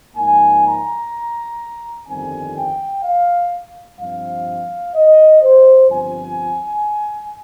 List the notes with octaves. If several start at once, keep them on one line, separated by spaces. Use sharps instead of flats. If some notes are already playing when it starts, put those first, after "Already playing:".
G#2 F3 A#3 D#4 G#5
A#5
G1 F2 D#3 G3 C4 G#5
G5
F5
G2 F3 C4 F5
D#5
C5
G1 G2 F3 C4 F4 G#5